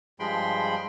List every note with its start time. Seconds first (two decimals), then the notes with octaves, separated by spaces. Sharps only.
0.20 G2 F3 G#3 G5 B5 C6